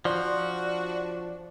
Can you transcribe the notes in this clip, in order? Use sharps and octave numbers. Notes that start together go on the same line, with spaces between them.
F3 D4 F#4 D5 C6